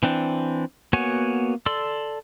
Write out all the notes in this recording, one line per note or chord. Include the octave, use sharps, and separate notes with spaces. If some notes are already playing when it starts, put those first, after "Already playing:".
E3 C4 D4
A#3 B3 F#4 C#5 G#5
A4 D5 C6 E6